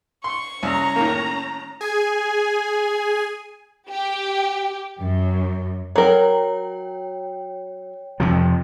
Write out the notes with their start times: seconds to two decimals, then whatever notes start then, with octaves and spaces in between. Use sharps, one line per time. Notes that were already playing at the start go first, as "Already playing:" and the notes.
0.24 C6 C#6
0.63 C2 C#4 A#5
0.96 A2 D#3 A#3
1.81 G#4 G#5
3.90 G4
4.99 F#2
5.96 F#3 A#4 C#5 G5
8.20 F2 C3 F3